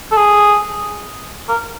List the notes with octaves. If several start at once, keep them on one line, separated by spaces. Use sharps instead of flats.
A4
G#4
A#4